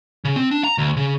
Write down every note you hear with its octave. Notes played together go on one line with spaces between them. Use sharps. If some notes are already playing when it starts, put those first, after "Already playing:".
C#3
C4
D4
A#5
D2
C#3